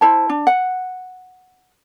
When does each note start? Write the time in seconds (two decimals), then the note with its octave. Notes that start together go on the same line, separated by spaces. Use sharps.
0.01 E4 C5 A5
0.29 D4
0.47 F#5